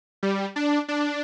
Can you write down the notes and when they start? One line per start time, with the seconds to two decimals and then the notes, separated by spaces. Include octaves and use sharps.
0.23 G3
0.56 D4
0.88 D4